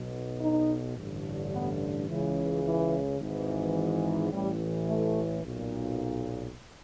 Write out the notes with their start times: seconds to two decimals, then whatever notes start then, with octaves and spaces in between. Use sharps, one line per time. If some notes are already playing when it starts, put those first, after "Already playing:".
Already playing: B1 B2
0.40 D#4
0.97 A1 G2 D3
1.52 B3
2.08 C#2 C#3 E3
2.64 E3
3.19 G#1 G#2 E3
4.31 A1 A2 E3 G3
4.87 A3
5.43 B1 A#2